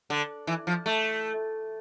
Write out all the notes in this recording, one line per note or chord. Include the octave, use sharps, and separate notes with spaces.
D3
E3
F3
A3